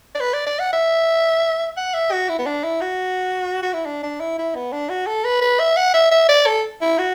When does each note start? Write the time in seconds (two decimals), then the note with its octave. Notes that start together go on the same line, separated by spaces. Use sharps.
0.15 D5
0.20 B4
0.33 D5
0.47 D5
0.59 F#5
0.73 E5
1.77 F#5
1.94 E5
2.12 F#4
2.29 E4
2.39 B3
2.46 D4
2.64 E4
2.81 F#4
3.62 F#4
3.74 E4
3.86 D4
4.03 D4
4.20 E4
4.38 E4
4.55 B3
4.73 D4
4.89 F#4
5.07 A4
5.24 B4
5.41 B4
5.60 E5
5.77 F#5
5.94 E5
6.11 E5
6.29 D5
6.47 A4
6.81 E4
6.99 F#4